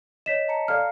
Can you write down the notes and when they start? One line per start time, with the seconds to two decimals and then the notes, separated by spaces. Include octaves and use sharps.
0.26 C#5 D#5 B6 E7
0.48 A5 A#5 C#7
0.68 A4 D5 F5 F6 C7